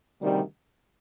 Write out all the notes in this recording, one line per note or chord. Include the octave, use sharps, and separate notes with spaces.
D2 C3 D#3 G3